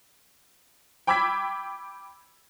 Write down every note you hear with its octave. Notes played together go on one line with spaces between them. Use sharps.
G5 B5 D6 E6 G#6 B6